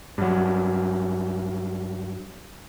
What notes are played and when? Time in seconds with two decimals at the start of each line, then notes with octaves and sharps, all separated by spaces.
0.18 G2 F#3